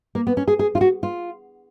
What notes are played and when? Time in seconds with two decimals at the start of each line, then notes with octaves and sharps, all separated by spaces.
0.15 A#3
0.27 B3
0.37 C#4
0.48 G#4
0.59 G#4
0.75 F4
0.81 F#4
1.03 F4